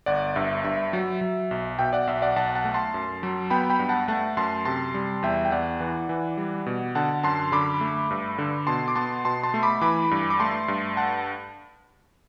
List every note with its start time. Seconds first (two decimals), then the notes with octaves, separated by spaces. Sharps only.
0.06 G1 D5 F#5
0.36 G2 E5
0.64 G2 E5
0.93 F#3
1.21 F#3
1.51 B1
1.79 B2 E5 G5
1.93 D5 F#5
2.07 B1 E5
2.22 D5 F#5
2.36 B1 F#5 A5
2.55 F#5 A5
2.64 A3
2.74 A5 C6
2.94 F#2
3.23 F#3
3.50 B3 G5 B5
3.70 G5 B5
3.79 G2
3.89 F#5 A5
4.08 A3 F#5 A5
4.37 F#2 A5 C6
4.65 C3 A5 C6
4.94 G3
5.23 E2 E5 G5
5.45 G5
5.51 E2 D5 F#5
5.80 E3
6.09 E3
6.37 G3
6.66 B2
6.95 D3 F#5 A5
7.23 F#2 A5 C6
7.52 D3 B5 D6
7.81 A3
8.11 G2
8.38 D3
8.67 B2 A5 C6
8.88 D6
8.95 B3 A5 C6
9.25 B2 A5 C6
9.43 A5 C6
9.54 A3
9.63 B5 D6
9.81 E3 B5 D6
10.11 G2
10.30 D6
10.40 A3 A5 C6
10.68 G2
10.97 F#5 A5